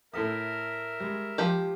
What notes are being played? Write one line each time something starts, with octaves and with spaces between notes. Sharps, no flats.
A2 A4 A#4 E5 D#6
G3 G#3
F3 G4